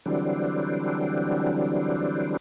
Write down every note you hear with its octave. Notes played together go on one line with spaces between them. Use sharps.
D3 E3 F#3 G3 C4 D4